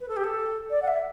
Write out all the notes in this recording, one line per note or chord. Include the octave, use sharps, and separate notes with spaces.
B4
A4
G4
A4
D5
F#5
E5